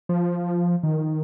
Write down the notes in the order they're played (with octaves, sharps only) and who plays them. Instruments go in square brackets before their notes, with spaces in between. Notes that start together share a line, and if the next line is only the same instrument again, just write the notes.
[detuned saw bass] F3
D#3